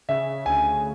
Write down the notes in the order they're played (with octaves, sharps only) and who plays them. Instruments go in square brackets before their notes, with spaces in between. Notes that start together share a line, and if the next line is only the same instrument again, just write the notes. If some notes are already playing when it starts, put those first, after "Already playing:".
[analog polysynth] C#3 [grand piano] E5
[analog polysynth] D2 [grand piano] G#5